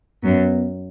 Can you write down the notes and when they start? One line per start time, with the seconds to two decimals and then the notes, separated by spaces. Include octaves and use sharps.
0.23 F#2 B3